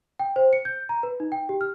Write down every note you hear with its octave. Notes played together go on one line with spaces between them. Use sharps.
G5
C5
C#7
G6
A#5
B4
D#4
G5
G4
F6